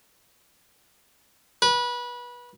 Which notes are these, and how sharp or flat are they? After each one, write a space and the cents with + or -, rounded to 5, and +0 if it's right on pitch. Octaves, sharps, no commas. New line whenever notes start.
B4 -25